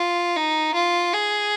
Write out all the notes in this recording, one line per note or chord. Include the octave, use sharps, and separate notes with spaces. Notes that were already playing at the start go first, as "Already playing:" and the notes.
Already playing: F4
D#4
F4
G#4